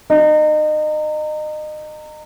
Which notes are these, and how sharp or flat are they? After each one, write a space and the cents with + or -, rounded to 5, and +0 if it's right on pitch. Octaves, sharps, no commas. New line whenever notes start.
D#4 -30